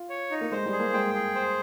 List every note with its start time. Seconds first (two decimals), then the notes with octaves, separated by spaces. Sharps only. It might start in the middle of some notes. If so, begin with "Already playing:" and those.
Already playing: F4
0.10 C#5
0.31 D#4
0.41 A#3
0.52 G#3 C5
0.66 G3
0.73 G#4
0.79 A#3
0.94 G#3 G5
1.14 G#4
1.35 C5